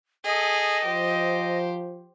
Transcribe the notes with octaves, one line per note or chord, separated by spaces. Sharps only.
G#4 A4 D#5
F3 G4 C5